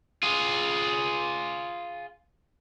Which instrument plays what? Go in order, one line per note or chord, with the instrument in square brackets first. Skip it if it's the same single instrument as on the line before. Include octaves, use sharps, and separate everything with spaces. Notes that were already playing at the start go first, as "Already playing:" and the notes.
[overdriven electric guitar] F4 G#4